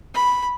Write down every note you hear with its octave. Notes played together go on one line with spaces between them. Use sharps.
B5